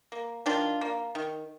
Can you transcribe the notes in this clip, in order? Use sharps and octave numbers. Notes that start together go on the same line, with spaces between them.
A#3
D#3 D4 F4
A#3
D#3